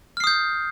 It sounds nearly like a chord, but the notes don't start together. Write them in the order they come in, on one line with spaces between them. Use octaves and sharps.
F6 C7 D#6 G6